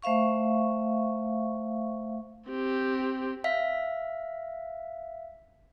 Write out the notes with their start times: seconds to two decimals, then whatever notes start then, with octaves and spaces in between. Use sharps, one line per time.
0.02 A3 C5 E5 F5 C#6
2.49 C4 G4
3.44 E5 F5 B6